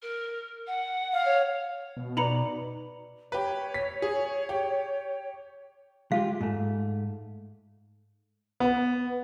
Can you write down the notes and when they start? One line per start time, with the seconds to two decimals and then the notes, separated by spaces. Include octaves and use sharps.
0.02 A#4
0.67 F#5
1.13 F5
1.25 C#5
1.97 B2
2.17 D#4 B4 D5 A#5 B5 C#7
3.32 G4 B4 C#5
3.74 B6
4.02 G#4
4.49 G4
6.12 G#3 F4 G4 F5
6.41 G#2 A3
8.60 B3